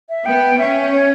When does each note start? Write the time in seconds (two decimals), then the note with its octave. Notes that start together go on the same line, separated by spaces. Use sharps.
0.09 E5
0.26 B3 G5
0.59 C#4 E5
0.92 C#5